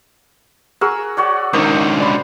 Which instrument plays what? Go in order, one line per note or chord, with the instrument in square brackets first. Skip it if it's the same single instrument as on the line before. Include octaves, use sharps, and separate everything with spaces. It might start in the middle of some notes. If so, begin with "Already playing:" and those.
[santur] F#4 A#4 E6 [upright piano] G#4
[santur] F#4 C#5 D5
[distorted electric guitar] C#2 D3 [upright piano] D#3 A#4 D#6 [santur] C5
[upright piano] D5 B5 C6